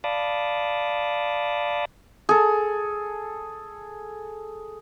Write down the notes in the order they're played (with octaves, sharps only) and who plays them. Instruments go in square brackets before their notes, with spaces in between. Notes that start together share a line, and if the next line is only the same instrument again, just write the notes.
[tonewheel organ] D5 F5 A5 B5 D6 D#6
[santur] G#4 A4